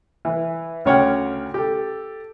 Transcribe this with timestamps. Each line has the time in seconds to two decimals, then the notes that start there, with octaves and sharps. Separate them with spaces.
0.25 E3 B4
0.85 D2 C#3 C#5 F#5 G5 F6
1.54 G4 A4